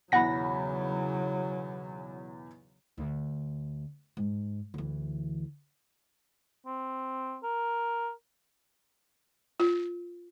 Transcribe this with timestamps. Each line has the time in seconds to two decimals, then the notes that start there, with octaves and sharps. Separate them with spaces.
0.12 B1 E2 C#3 F#3 F#5 B5 A#6
2.98 D2
4.17 G#2
4.74 D2 E3
6.66 C4
7.43 A#4
9.60 F4